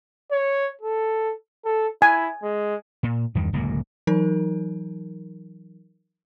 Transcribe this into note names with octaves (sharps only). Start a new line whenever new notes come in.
C#5
A4
A4
E4 G#5
G#3
A#2
E2 G2 D#3
D1 C#2 F#2 A#3
E3 F#3 D#4 A#4